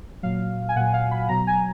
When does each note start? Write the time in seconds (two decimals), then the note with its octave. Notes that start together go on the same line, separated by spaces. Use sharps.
0.23 A#2 F#3 F5
0.69 G#5
0.76 A#2 F#3 F#5
0.94 F5
1.11 B5
1.29 B2 F#3 A#5
1.47 G#5